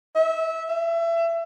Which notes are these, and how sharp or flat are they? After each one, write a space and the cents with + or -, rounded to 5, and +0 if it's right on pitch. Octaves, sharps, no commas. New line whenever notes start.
E5 -20
E5 +25